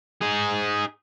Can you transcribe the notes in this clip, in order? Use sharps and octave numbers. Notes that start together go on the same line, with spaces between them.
D#4 G#4